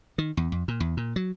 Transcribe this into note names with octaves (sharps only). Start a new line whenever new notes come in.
D#3
E2
F2
A#2
E2
A#2
F#3